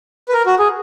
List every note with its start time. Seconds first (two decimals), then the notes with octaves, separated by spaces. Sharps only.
0.29 B4
0.33 A#4
0.46 F#4
0.59 G#4